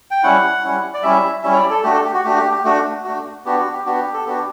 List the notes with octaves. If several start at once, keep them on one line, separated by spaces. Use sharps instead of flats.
G5
G3 C#4 E4 F#5
G3 C#4 E4
D5
G3 C#4 E4 E5
G3 C#4 E4 E5
C#5
D5
A4
A3 D4 F#4 G4
A4
G4
F#4
A3 D4 F#4 G4
G4
G4
A3 D4 F#4
A3 D4 F#4
B3 D4 F#4 G4
F#4
G4
B3 D4 F#4 G4
A4
B3 D4 F#4 G4